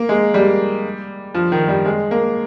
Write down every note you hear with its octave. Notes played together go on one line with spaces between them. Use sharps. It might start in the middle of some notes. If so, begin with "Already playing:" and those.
Already playing: A#3
G#3
G3
F3
D#3
G3
G#3
A#3